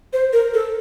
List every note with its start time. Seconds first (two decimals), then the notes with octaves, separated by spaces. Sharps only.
0.13 C5
0.33 A#4
0.54 A4